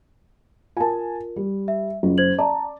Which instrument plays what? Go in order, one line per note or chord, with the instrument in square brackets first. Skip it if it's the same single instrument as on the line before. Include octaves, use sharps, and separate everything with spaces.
[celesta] F4 A#4 [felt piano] G#5 A5
[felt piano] G3
[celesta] E5
[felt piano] F#1 [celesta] F4
[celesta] C5 G#6 F#7
[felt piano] D5 [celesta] A5 A#5